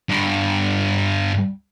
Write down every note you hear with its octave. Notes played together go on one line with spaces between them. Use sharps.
G2 D3